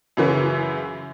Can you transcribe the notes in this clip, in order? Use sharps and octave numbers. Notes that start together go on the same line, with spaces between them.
F#2 C#3 E3 F#3